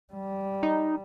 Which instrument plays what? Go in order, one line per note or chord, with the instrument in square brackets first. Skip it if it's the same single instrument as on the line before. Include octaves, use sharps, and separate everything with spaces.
[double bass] G3
[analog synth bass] D#4